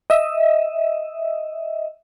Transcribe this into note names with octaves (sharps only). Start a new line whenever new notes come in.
D#5 E5